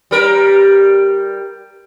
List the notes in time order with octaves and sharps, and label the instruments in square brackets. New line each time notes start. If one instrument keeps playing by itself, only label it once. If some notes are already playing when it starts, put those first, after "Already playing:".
[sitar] G3 A#4